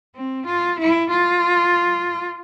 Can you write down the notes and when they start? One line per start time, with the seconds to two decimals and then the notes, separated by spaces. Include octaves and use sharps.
0.15 C4
0.46 F4
0.80 E4
1.10 F4